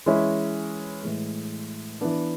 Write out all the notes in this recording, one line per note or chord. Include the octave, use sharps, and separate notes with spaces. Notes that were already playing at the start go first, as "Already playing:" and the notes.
E3 G#3 C#4 E4
A2 E3 G#3
E3 B3 D4